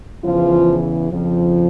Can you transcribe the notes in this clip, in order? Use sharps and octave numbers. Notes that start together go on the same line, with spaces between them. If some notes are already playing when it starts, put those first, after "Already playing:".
E2 C#3 E3 F3 F4
F2 C#3 F3